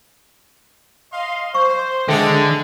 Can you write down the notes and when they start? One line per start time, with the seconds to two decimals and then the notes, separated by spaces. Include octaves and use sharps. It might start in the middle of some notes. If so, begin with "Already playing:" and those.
1.13 D#5 F5 C6
1.54 C5 C#6
2.08 D3 G#3 A4 E5 G5